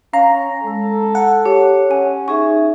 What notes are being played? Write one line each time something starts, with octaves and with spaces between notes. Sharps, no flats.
C#4 F5 A#5
G#3 A4 E6
F#5
G4 C#5
C#4 G#5
D#4 G#4 E5 C#6